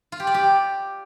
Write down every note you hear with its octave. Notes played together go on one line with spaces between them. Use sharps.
F4
G4
D5
G4